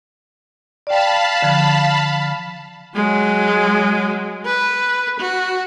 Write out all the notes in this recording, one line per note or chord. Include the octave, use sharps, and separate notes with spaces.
D5 F5 G5 A5 B5
D3 F3
F#3 G#3
B4
F#4